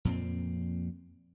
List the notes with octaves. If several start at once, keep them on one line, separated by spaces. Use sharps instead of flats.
F2 A#2 C4